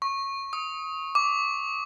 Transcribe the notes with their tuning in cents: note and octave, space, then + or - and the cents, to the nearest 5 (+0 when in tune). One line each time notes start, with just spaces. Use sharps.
C#6 -15
D#6 +25
D6 -15